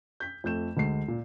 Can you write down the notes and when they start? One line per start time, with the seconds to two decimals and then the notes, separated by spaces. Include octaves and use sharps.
0.20 G6 B6
0.44 F2 A3 G6 E7
0.77 D2 G#3 C7
1.08 A#2